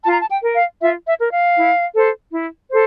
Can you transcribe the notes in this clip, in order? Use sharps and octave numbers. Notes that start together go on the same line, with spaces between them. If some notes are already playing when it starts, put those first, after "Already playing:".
F4 A5
A#5
A5
G5
A#4
F5
F4 E5
E5
A#4
F5
E4
A4 C5
E4
A4 C5